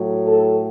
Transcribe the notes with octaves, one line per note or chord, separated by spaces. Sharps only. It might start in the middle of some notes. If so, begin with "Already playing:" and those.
Already playing: A2 F#3
A4